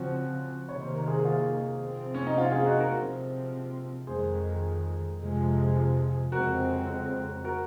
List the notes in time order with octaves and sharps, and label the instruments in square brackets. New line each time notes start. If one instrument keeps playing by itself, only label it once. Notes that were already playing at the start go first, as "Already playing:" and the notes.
Already playing: [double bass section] C#3 F3 C4 [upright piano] F#4
[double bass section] C3 D#3 A#3 [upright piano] C#5
[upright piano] C5
A#4
G#4 C5
F4 G#4
[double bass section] C3 F3 C4
[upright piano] C#4
D#4
C#4 F4
F4 G#4
D#4 F#4
F#4 A#4
[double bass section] C3 F3 C4
[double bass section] F2 D#3 G#3 [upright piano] G#4 C5
[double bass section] F2 C3 F3 G#3
[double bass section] F2 C#3 G#3 C4 [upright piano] F#4 A#4
[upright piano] F#4 A#4